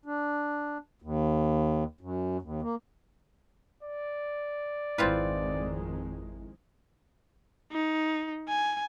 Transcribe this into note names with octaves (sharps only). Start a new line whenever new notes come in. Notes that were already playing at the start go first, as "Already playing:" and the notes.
D4
D#2
F#2
D#2
A#3
D5
G#1 F2 D#3 G#3 C4 E4 F4 B4
D#4
G#5